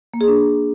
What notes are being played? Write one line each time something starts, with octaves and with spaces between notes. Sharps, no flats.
A#3
G#4
D4